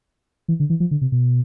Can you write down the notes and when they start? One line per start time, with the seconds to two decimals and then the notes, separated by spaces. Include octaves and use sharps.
0.48 E3
0.60 D3
0.70 E3
0.80 F3
0.91 D3
1.01 C3
1.12 B2